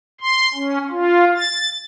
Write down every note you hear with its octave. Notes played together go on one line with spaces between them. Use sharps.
C6
C#4
F4
A6